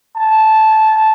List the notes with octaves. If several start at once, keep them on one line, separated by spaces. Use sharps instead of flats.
A5